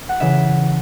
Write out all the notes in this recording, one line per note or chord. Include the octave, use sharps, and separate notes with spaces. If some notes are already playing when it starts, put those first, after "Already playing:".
F#5
C#3 E3 E5